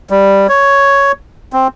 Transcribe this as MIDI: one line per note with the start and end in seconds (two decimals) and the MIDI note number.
0.10 0.47 55
0.49 1.12 73
1.53 1.68 60